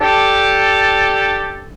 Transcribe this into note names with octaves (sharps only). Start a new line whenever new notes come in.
D4 G4 A4